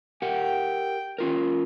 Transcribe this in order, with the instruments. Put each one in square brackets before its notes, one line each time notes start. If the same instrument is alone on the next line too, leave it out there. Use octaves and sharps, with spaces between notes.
[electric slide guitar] G4 A#4 F#5 [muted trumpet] G5
[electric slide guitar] C#4 F4 A#4